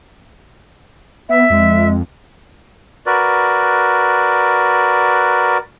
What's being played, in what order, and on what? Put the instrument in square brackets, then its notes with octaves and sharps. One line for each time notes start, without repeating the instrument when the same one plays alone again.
[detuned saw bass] B3 [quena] E5
[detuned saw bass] F2 [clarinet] G#3
[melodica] F#4 A#4 B4 D5